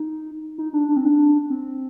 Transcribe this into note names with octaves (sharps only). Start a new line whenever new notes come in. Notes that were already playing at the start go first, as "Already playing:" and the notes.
Already playing: D#4
D#4
D4
D4
C4
D4
C4